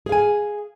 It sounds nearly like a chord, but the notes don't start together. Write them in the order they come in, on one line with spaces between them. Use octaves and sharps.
G#4 F5 G#5